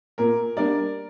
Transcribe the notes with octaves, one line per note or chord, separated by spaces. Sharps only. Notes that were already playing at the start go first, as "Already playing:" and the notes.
A#2 A#4
G3 A#3 D4 A#4 D5